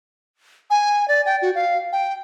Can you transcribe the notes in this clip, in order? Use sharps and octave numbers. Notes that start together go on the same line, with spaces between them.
G#5
D5
G5
F#4
F5
G5